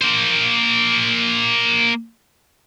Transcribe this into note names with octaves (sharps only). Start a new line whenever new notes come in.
A#3 C5